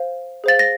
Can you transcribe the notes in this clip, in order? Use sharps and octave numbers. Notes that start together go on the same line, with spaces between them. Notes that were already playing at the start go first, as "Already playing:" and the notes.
Already playing: C5 F5
G#4 C5 F5 A6
A#6